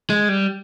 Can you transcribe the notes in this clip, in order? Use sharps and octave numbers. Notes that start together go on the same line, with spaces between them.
G#3
G3